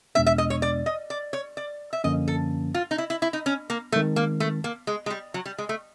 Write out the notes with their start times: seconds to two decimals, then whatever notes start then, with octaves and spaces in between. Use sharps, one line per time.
0.15 E2 B2 G#3 B3 D4 E5
0.26 E5
0.38 D#5
0.50 C#5
0.62 D5
0.86 D#5
1.10 D5
1.33 C#5
1.57 D5
1.93 E5
2.04 F#2 D3 F3 A#3 C#4 D#5
2.28 A4
2.74 F4
2.91 D#4
2.98 E4
3.10 E4
3.22 E4
3.33 D#4
3.46 C#4
3.70 A#3
3.92 D#3 G#3 A3 C4
4.16 A#3
4.40 A3
4.64 A#3
4.87 G#3
5.06 G#3
5.10 G3
5.34 F#3
5.46 G3
5.58 G#3
5.69 A3